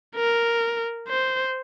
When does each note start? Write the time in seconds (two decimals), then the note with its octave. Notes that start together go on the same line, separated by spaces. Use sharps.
0.16 A#4
1.09 C5